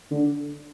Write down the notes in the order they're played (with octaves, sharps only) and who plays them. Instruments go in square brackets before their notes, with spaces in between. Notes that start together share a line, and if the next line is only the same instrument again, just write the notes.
[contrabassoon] D3